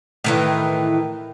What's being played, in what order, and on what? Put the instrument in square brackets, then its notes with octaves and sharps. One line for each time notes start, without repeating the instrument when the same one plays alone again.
[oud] A2 D#3 E3